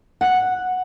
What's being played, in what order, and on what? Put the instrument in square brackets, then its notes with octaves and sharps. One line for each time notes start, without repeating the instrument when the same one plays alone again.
[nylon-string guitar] F#5